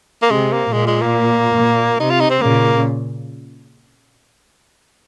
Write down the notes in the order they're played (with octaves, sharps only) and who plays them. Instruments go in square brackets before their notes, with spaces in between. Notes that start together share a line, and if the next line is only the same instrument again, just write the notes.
[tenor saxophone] A#3
[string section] C3 [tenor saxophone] G#3
[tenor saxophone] A#3
[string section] A#2 [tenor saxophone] G#3
[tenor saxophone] G#3
A#3
[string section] A#2
[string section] C3 [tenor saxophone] D#4
[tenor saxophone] F4
D#4
C4
[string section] A#2 C#3 [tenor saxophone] A#3